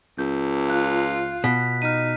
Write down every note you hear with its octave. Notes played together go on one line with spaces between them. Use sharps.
C#2 G6
F4 F#6
B2 B6
D#4 F6 D#7